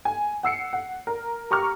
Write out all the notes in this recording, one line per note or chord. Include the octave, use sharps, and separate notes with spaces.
G#5
F#5 E6 C7 C#7
F#5
A#4
G4 A#5 C#6 D6 F6